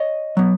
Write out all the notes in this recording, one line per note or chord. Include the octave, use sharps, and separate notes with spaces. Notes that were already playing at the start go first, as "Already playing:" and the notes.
Already playing: C#5 D#5
F#3 B3